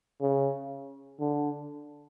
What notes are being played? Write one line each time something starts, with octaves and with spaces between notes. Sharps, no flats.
C#3
D3